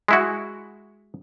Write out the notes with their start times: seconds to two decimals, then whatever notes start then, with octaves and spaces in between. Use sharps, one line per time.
0.08 G#3 E4 F#4